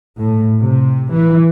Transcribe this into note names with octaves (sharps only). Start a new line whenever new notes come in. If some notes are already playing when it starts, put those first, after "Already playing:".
A2
C3
E3